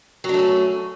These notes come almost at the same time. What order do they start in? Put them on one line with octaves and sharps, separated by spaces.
F#3 D4 A3 C#4